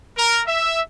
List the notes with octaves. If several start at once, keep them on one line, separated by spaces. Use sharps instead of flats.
A#4
E5